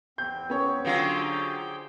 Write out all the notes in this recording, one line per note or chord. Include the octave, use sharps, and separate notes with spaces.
E2 C4 G6
B3 C#4 C#5
D3 F#3 F4 G4 G#4 C5 G5